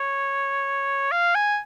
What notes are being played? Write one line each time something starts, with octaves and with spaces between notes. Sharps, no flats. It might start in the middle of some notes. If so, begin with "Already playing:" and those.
Already playing: C#5
F5
G#5